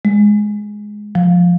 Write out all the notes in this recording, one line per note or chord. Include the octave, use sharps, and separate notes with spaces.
G#3
F3